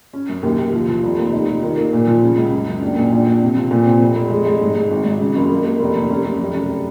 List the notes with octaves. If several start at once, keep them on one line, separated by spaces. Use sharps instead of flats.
C#4
F#2
D#2
D#2
F3
F3
F1
D#2
D#4
F3
D#3
A#3
A#2
F3
C#3
C#2
F#2
F#2
A#1
A#2
A#1
A#1
C3
F3
A#2
C4
F1
F1
G#3
G#3
G#2
G#2
G#1
G#1
C#3
F#1
A#3
A#3
F1
D#2
C#4
F#2
F1
C#3